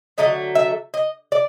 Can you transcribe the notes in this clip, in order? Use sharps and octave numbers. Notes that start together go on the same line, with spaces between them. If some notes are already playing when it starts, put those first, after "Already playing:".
D3 F#3 A3 D#5
E5
D#5
D5